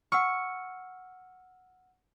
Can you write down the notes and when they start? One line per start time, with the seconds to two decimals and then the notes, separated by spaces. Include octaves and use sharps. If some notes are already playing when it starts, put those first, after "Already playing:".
0.12 F#5 C#6 E6 F6